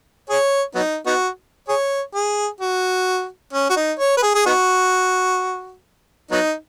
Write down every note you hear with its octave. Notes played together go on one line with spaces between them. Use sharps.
G#4 C#5
F#3 B3 D#4
B3 D#4 F#4
G#4 C#5
G#4
F#4
C#4
F#4
D#4
C#5
B4
G#4
G#4
B3 D#4 F#4
F#3 B3 D#4